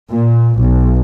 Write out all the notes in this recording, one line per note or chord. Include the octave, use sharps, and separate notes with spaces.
A#2
B1